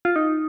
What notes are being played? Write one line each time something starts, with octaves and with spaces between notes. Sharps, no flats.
F4
D#4